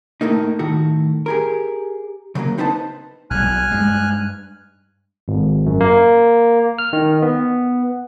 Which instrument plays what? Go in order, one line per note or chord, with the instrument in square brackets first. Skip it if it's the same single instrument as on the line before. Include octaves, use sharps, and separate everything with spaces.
[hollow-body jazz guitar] A2 A3 A#3 D#4
A2 D#3 A3 F#4
G4 G#4 A#4
C#3 F#3 G#3 A#3
C4 D#4 B4 C5 D#5 A5
[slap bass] B1 B2 G3 [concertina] G#5 F6 F#6
[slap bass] G2 G#3
[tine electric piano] G#1
F#2
A#3
F6
D#3
B3